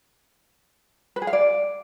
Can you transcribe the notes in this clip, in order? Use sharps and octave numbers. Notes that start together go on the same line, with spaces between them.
B4
G#4
F5
D5